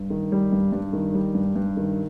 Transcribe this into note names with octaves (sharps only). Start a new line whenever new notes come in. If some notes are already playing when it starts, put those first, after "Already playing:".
Already playing: G2
D#3
G3
G2
G2
D#3
G3
G2
G2
D#3